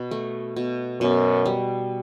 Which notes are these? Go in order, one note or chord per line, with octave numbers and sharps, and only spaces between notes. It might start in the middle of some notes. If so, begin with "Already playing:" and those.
Already playing: B2
A3
B2
F#2 B2
G3